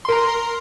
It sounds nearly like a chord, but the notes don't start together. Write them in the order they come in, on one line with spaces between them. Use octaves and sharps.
C6 A#4 A#5